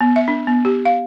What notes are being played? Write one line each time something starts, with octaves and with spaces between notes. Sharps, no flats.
B3
E5
D4
B3
G4
F5